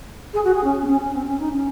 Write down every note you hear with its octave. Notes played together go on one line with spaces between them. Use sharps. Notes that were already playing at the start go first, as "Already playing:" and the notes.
G#4
F#4
G#4
C#4
C4
C#4
C#4
C4
C#4
D#4
C#4